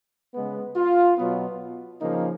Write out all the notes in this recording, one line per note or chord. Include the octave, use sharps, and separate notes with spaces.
C#3 G#3 B3
F4
B2 F#3 B3
C#3 F3 A#3 D#4